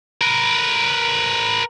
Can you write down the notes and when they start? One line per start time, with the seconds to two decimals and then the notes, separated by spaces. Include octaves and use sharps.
0.21 A#4 B4